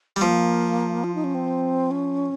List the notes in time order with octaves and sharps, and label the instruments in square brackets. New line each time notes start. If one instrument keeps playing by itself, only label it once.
[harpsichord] G3
[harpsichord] F3 [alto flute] A#3
[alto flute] F4
D#4
C#4
C4
C#4